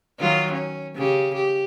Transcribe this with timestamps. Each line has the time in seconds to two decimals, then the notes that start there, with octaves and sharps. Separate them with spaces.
0.20 D#3 F#3 F4
0.52 C#4
0.95 C#3 G4
1.35 G4